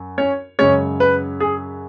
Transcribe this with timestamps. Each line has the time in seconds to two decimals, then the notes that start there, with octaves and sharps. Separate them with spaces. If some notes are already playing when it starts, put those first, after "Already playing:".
Already playing: F#2
0.18 C#4 C#5
0.59 F#2 C#3 G#3 C#4 C#5
1.00 B4
1.40 G#4